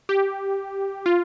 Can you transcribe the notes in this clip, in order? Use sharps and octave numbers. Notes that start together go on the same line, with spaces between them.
G4
F4